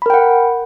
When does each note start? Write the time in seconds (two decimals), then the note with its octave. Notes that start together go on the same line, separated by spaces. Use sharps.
0.02 B5
0.06 A#4
0.10 G5
0.14 F#5